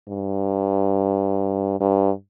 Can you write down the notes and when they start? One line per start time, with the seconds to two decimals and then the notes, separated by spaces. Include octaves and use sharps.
0.09 G2
1.80 G2